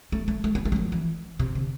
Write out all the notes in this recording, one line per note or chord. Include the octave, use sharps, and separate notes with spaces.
A3
A3
A3
B3
A3
G3
F3
E3
C3
D3